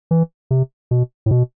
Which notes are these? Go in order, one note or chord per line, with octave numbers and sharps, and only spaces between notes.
E3
C3
B2
A2
B2